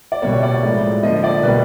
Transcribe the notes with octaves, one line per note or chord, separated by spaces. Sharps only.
D5
B2 G3 A#3 C#5
D5
A2 F3 G#3
D3 F3 A#3 D#5
D5
B2 G3 A#3 B4